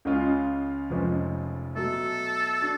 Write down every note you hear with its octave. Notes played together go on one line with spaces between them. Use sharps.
C#2 C#3 G#3 C#4 F4
F1 F2 F3 G#3 C#4
B2 F#3 A3 A4
D4 F#4